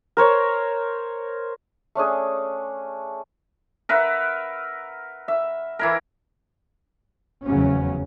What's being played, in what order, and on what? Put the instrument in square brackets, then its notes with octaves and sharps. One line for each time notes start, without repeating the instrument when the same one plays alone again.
[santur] A#4 C5 C#5
A3 C#4 D4 G#4
[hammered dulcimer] A#4 B4 E5 F#5
E5
E3 E4 A#4
[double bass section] F1 E2 C#3 F#3 C#4